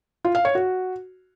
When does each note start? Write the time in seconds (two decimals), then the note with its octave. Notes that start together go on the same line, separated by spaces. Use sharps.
0.25 F4
0.35 F5
0.45 C#5
0.55 F#4